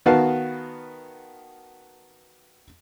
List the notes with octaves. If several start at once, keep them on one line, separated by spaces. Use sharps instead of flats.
D#3 B3 F#4 B4 F5 A5